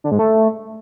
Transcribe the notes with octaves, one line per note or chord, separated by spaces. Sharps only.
D3
G#2
A3